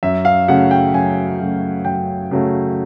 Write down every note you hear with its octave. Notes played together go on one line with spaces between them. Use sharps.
F#2 E5
F5
C#3 F#3 A3 F#5
G5
F#2 G#5
C#3 F#3 A3
F#2 G5
C#3 F#3 A3